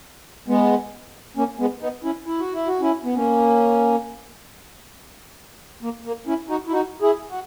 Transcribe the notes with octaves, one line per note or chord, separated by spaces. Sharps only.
G#3 B3
A#3 C#4
G#3 B3
B3 D#4
C#4 E4
E4
F#4
E4
F#4
C#4 E4
B3
A#3 C#4
A#3
A#3
C#4 E4
D#4 F#4
E4
D#4 F#4
E4 G#4
F#4